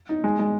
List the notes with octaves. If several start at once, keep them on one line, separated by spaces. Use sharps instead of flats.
D#4
G#3
G#3